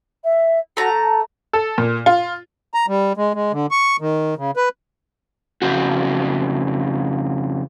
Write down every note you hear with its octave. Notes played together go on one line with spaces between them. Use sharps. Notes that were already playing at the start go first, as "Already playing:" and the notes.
E5
A3 F#4 A#5
A5
A4
A#2
F4
A#5
G3
G#3
G#3
D3
C#6
D#3
C#3
B4
F2 A#2 C#3 F#4